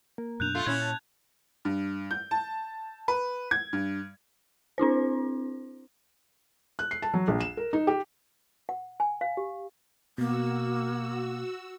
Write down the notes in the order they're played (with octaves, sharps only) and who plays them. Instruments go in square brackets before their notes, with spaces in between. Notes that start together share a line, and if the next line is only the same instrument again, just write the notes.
[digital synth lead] A#3
[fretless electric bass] F#2 B2 D4 [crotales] F#6 G6 F7
[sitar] A3 F4 [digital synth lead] C6
[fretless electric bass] A#2 [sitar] C#4 E4 [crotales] G#6
[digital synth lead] A5
[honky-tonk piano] G2
G6
A5
B4
G#6
G2
[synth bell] C4 D4 E4 C5
[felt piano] F#6
C7
A5
F#3
A#1
E7
A#4
D#4
G4
[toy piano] F#5
G#5
F5
G4
[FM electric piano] B2 [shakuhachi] A#3 [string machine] F#4 E6